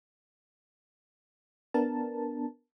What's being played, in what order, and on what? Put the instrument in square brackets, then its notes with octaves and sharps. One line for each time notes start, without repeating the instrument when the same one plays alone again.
[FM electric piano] B3 D4 A#4 A5